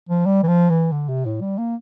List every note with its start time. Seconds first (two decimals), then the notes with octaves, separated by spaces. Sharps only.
0.09 F3
0.26 G3
0.43 E3
0.48 F3
0.70 E3
0.92 D3
1.09 C3
1.26 A2
1.41 G3
1.58 A#3